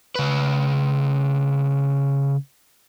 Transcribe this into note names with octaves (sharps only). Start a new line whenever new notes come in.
C#3 B4